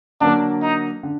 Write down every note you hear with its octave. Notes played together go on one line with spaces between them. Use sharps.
D3 F#3 A#3 D4
D#4
D3